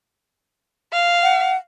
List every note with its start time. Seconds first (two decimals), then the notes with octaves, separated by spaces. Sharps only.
0.92 F5
1.23 F#5